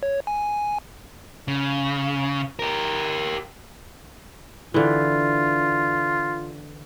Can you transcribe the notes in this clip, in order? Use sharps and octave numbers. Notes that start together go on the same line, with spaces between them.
C#5
G#5
C#3
G4 A#4
D3 E3 F4